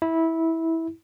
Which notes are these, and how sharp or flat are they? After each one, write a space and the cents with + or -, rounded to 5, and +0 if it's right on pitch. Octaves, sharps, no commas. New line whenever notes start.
E4 -15